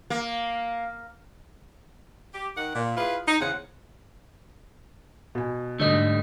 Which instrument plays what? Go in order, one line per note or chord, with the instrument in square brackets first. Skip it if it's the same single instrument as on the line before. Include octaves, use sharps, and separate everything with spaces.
[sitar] A#3
[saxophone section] G4
D#3 F#5
A#2
E4 F4 G#4 B4
D#4
E2 C#3 C5 F#5
[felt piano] B2 G#5
[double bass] G#2 [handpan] D3 D#5 [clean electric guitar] G3 A3